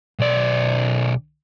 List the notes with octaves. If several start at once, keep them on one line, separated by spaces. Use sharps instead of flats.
B1 D5